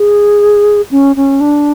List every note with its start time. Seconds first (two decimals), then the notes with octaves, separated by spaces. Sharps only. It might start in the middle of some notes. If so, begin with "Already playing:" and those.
Already playing: G#4
0.91 C#4
1.16 C#4
1.41 D4